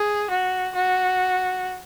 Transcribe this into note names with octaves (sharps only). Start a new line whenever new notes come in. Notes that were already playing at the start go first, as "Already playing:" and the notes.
Already playing: G#4
F#4
F#4